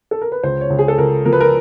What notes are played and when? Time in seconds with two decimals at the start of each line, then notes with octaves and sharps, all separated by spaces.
0.11 A4
0.22 A#4
0.32 B4
0.43 C#2 C5
0.61 C#5
0.70 C#2
0.79 G#4
0.88 A4
0.98 C#2 A#4
1.25 F3 A#4
1.33 B4
1.41 A#4